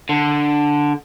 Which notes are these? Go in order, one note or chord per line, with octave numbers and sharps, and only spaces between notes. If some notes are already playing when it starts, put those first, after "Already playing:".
D3